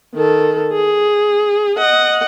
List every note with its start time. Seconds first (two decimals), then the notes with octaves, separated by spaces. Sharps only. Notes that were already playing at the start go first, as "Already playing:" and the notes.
0.14 D#3 A4
0.73 G#4
1.78 D#5 F#5